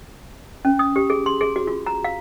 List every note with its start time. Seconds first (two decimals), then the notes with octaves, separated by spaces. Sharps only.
0.65 C#4
0.79 D#6
0.96 G4
1.10 G#4
1.26 C6
1.41 G#4
1.56 F#4
1.67 F4
1.86 A#5
2.04 F5